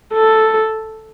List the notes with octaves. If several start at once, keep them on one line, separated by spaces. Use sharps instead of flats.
A4